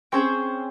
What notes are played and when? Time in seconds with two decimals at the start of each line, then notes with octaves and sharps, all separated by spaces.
0.12 C4 C#4 G#4 C5 G5